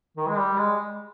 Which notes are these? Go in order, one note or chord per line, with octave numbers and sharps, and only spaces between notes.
D#3
G#3
G3
G#3